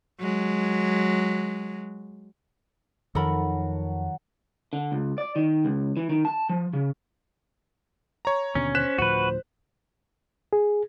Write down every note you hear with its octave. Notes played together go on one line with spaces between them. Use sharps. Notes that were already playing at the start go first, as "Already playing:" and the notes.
F#3 G#3
F2 D#3 F#3 A4 A#4 F#5 A5 B5
D3
C#2
D5
D#3
C#2
E3
D#3
A5
F3
C#3
C#5 A#5
D#2 B2 D3 C#4
C5 F#6 B6 E7
D2 A2 F3 F#4 B4
G#4